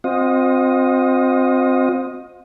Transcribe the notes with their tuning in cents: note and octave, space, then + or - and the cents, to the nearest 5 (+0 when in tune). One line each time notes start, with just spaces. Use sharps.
C4 +0 F4 +45 D#5 +0